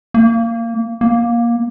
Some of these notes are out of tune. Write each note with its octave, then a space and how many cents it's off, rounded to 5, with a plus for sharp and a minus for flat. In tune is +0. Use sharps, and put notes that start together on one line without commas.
A#3 -20
A#3 +15